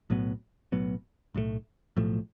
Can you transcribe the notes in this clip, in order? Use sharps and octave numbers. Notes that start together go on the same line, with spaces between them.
B1 A2 F#3 B3
B1 A2 F#3 B3
B1 A2 F3 A3
B1 A2 F3 A3